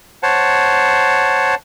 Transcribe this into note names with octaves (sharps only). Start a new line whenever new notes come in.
C5 C#5 F#5 A5